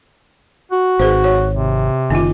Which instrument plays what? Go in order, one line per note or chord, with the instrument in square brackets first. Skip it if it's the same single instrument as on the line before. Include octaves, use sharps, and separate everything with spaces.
[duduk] F#4
[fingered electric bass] G#1 [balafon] G#4 B4 C5
[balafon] C#5
[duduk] C3
[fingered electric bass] F#1 D#3 [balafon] A#3 F4